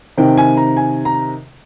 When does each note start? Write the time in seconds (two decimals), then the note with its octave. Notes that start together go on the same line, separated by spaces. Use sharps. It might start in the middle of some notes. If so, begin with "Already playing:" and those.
0.17 C3 D#3 G5
0.38 G#5
0.57 A#5
0.77 G#5
1.05 A#5